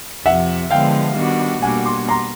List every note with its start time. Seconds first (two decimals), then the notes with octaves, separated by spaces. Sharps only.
0.25 F2 C3 F3 E5 F#5
0.71 D3 F3 G#3 B3 F5 G5
1.16 D#3 G3 B3 D4 F#4
1.62 B2 G3 A#3 D4 F#4 F#5 G#5
1.86 C6 D6
2.09 A#5 C6